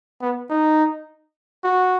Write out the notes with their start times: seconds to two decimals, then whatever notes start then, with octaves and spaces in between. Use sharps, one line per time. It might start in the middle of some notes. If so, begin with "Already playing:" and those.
0.22 B3
0.50 D#4
1.64 F#4